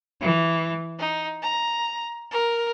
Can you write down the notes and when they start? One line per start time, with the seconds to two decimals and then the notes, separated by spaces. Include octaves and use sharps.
0.21 E3
0.98 D#4
1.42 A#5
2.31 A#4